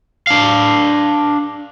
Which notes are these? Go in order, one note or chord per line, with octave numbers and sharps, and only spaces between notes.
D4 F5